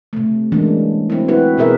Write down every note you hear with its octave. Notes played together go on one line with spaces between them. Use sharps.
C3 A3
E3 F#3 G#3 A#3 C#4 D4
F#3 C4 E4
E4 F#4 B4
B2 B3 G#4 A#4 B4 E5